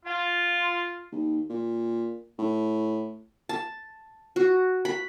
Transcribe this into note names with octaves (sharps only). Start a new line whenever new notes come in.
F4
D#2
A#2
A2
A5
F#4
B5